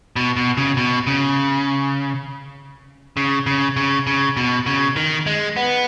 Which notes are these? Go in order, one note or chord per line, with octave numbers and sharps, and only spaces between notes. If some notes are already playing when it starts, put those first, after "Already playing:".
B2
B2
C#3
B2
C#3
C#3
C#3
C#3
C#3
B2
C#3
D#3
G#3
B3